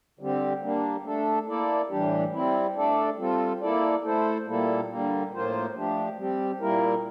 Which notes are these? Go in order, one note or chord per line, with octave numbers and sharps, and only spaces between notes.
D3 G3 C4 G4
G3 A#3 D4
A3 D4 A4
A#3 E4 A4 D5
A2 E3 G3 D4 G4
G3 C4 E4
A3 D4 A4 D5
G3 C4 F4 A4
A#3 E4 A4 D5
A3 E4 A4 C5
A#2 G3 A#3 E4 A4
D3 G3 A#3
A2 F3 A#3 F4 C5
F3 A3 D4 G4
G3 C4 G4
A#2 G3 A#3 E4 A#4